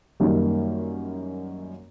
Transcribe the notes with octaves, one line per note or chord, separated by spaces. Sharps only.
F#2 D#3 G3 A#3